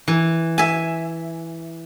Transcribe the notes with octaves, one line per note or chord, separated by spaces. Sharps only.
E3
E5 G#5